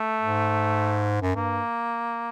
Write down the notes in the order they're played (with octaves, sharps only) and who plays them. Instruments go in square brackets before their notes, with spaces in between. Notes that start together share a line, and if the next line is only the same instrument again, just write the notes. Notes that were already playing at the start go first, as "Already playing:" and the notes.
Already playing: [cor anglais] A3
[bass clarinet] G#2
F#2
[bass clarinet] G2 [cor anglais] A#3